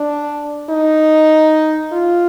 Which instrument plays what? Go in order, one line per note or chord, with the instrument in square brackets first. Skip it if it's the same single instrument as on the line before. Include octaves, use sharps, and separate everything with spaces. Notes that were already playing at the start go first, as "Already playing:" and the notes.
Already playing: [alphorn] D4
D#4
F4